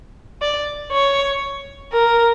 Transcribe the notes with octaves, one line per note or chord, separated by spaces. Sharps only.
D5
C#5
A#4